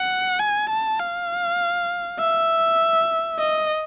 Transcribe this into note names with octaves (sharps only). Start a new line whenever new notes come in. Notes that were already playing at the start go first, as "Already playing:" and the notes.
Already playing: F#5
G#5
A5
F5
E5
D#5